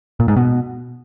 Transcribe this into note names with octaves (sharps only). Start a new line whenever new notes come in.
A#2
G#2
B2